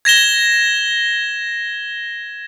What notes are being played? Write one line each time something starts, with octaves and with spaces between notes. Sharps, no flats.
G#6 A#6 E7 G7